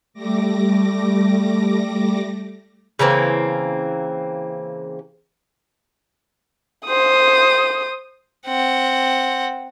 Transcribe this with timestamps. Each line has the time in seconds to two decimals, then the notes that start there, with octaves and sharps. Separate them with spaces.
0.14 G3 A3 D6 A#6
2.99 C#3 E3 A#3 C4
6.86 C5 D#6
8.47 C4 F#5